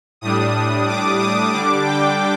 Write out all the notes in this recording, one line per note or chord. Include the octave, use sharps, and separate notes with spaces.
A2 G3 D4 D#6
D6
D#6
D3 G3 D4 D6
G5